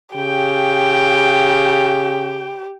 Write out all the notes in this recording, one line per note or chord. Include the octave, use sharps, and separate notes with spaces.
C#3 G4 G5